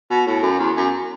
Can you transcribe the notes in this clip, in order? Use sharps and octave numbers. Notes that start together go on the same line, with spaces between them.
B2
A2
F#2
E2
F#2